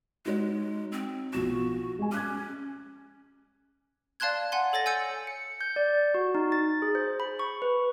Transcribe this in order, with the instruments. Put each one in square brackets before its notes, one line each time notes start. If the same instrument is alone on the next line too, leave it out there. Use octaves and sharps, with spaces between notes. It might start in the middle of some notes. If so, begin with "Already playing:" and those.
[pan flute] G#3 [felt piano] D#4 F#4 C#5
[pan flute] C4
[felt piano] B1 F3 E7 [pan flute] F#4
[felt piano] G#3 G#5
[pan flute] C#4 [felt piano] D6 F#6 G#6
[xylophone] D5 F5 A5 C6 F#6 G#6
F#5 G#5 C6
A4 C#5 A6 A#6
G#5 E6 G6 C#7
[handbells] C#7
G6
D5
F#4
D#4
A6
G#4
C5
B5
C#6
B4